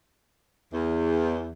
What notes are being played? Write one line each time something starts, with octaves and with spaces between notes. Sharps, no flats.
E2